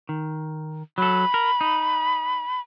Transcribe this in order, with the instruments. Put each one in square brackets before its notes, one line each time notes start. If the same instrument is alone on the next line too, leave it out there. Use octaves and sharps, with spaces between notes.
[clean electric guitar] D#3
[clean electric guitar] F#3 A4 [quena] B5
[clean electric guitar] A#4
D#4